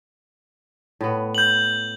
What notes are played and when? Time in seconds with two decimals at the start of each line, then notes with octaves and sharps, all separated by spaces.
1.01 A2 B3
1.35 G6 F#7